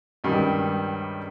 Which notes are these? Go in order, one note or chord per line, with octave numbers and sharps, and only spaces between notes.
C#2 G2 D#3 G3